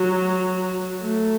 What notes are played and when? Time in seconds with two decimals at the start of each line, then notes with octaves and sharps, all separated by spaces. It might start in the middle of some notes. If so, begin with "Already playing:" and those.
Already playing: F#3
1.01 A3